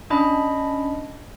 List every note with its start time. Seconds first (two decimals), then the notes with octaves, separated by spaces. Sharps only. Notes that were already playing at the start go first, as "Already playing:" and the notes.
0.10 C#4 D4 D#5 B5